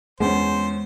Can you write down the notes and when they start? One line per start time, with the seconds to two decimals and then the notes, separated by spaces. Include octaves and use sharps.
0.20 E2 G#3 C#4 C5